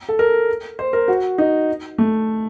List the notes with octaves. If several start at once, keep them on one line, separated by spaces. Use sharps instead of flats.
A4
A#4
C5
A#4
F#4
D#4
A3